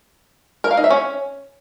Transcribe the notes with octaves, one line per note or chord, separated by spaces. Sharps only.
A#4
F5
D#4
E5
C#4